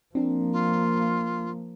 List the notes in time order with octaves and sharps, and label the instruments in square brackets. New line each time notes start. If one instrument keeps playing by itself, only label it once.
[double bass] F3 A#3 [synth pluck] C4 D4
[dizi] F4